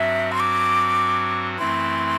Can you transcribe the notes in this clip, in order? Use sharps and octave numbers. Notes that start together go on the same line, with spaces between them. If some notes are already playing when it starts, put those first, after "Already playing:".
Already playing: G2 F#3 C4 F#4 E5
C6
D6
F#2 E3 A3 C4 E4 C6